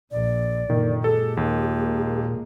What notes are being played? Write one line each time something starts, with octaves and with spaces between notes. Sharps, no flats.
A#1 A#2 D5
F#1 A#2 D3 D#3
G#3 G4 A4
D#2
G#3 A#3